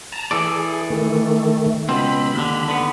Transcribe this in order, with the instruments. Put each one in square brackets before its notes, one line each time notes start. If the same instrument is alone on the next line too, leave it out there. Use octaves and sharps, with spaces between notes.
[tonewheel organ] A5 A#5
[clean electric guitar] E3 A4 D5 [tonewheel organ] G#4
[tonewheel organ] D#3 A3
[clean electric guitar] C#2 B2 C4 [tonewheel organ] B5
[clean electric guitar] D#2 D3
D3 B3